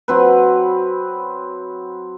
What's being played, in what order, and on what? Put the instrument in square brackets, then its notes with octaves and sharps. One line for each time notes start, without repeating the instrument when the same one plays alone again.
[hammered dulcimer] F#3 C4 B4